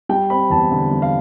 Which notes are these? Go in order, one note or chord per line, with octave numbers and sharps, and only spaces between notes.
G3 G5
C4 B5
E2 A5
D3
G3
F5